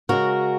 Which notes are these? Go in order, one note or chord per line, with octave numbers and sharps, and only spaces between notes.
C#3 G#3 F#4 A#4